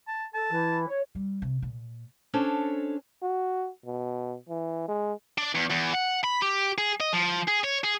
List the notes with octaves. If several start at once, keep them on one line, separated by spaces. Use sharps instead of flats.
A5
A4 A5
E3 E4
C#5
G3
C3
A#2
C#4 D4 A4 C5 C#5
F#4
B2
E3
G#3
D4
E2
E2
F#5
B5
G4
G#4
D#5
F3
G#4
C#5
G#4